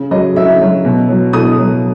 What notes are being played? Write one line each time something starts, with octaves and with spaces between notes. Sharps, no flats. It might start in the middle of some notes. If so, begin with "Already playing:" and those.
Already playing: C#3
F#3 D#5
C#3 E5
F#3
B2
F#3
B2 D#6
F#3